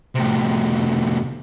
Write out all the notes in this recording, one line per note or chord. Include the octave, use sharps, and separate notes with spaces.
A2 C3